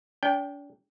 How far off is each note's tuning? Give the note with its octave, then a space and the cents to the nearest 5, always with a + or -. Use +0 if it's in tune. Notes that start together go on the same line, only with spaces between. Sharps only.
D4 -45 G5 +0